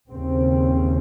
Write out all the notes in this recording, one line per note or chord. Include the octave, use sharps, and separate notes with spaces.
D#2 C#3 C4